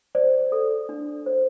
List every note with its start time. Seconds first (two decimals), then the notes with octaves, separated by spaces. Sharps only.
0.15 C5 D5
0.52 A4
0.89 D4
1.26 C5